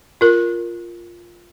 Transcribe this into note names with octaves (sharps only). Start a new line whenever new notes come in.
F4 A#4